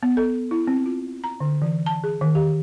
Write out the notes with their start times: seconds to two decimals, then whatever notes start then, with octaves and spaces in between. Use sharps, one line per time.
0.03 B3
0.17 A4
0.51 E4
0.67 C4
0.86 F4
1.24 A#5
1.40 D3
1.62 E3
1.86 A5
2.04 G#4
2.21 D#3
2.35 G4